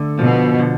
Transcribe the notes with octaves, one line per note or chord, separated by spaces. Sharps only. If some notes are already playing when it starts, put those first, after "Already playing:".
Already playing: D3 A3
B2 F3
D3